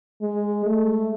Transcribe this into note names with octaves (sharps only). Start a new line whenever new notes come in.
G#3
A3